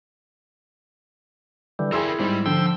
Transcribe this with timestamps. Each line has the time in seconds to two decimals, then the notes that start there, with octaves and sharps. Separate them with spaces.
1.79 D3 E3 G3
1.92 E4 G#4 A#4 E5 G5 C6 E6
2.19 G#2 G3 G4
2.46 D3 F3 G5 E6